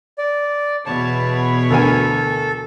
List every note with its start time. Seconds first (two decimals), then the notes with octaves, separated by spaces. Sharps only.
0.18 D5
0.86 E2 B2 C#5 A5
1.70 D2 A4 A#4 G#5